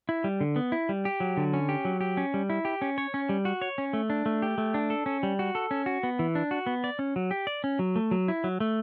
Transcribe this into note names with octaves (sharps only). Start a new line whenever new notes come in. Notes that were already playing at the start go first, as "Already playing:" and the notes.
E4
G3
D3
B3
E4
G3
G4
F#3
D3
C#4
G4
F#3
G4
C#4
G3
E4
G4
C#4
C#5
C#4
G3
F#4
C#5
C#4
A3
D4
A3
G4
A3
D4
A4
C#4
G3
F#4
A4
C#4
F#4
B3
E3
D4
F#4
B3
D5
C#4
F#3
G4
D5
C#4
F#3
A3
F#3
E4
F#3
A3